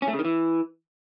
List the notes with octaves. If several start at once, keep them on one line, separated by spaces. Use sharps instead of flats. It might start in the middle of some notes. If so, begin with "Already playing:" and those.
C#4
A3
C#3
D#3
E3